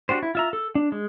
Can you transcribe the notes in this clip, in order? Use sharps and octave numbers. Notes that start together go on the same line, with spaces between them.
D4 F#4 G4 C5
E4
F4 E5 A#5
A4
D4
G#3